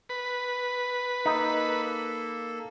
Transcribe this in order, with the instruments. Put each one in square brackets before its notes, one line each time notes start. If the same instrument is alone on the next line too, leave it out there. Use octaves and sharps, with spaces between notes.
[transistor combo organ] B4
[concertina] A#3 A4 [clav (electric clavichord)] D#4